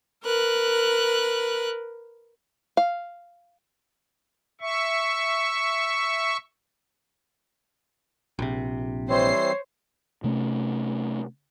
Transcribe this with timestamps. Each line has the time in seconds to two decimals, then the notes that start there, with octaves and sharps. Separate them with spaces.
0.24 A#4 B4 F#6
2.77 F5
4.61 E5 C#6
8.39 A#1 C3
9.09 E3 G3 C4 C5 C#5 C7
10.24 C3 A3 B3 C#4